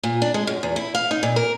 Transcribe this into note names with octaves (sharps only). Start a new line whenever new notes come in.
A#2
D4
G#3
F#2
E2
E4
F5
D#4
A#2
A#4